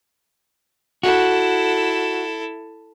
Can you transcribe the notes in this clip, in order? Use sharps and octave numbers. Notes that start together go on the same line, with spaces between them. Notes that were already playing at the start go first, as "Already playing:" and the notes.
E4 F#4 A4